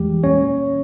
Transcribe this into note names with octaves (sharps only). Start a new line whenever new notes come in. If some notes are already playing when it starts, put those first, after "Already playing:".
Already playing: E2 E3 G3 G#3 G4
A#2 G3 A#3 C#4 C#5